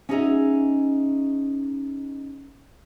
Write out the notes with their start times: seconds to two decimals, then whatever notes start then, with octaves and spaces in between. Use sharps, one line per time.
0.09 C#4 D#4 F#4 G#4 D#5 E5